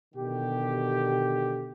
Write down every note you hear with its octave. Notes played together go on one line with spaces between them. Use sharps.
B2 D3 D#3 G4